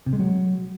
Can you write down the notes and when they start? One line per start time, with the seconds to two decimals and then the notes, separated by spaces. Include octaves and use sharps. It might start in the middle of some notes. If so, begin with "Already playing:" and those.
0.06 C3
0.13 G#3
0.19 F#3